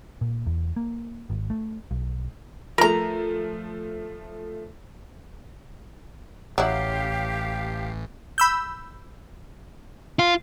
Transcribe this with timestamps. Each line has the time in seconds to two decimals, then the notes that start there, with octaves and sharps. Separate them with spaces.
0.21 A#2
0.46 E2
0.76 A#3
1.30 G#1
1.50 A3
1.91 B1
2.78 F3 A3 A#4 A#5
6.58 A1 F#3 E4 G4 F5
8.38 B5 E6 G6
10.19 F4